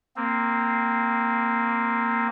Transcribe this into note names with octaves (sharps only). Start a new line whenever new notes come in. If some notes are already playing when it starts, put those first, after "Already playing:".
A#3 C4